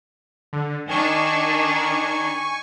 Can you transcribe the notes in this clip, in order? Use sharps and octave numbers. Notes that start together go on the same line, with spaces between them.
D3
D#3 D4 D#4 G#5 C#6